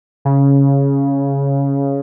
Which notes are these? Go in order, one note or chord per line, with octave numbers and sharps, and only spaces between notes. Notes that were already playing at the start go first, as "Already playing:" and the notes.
C#3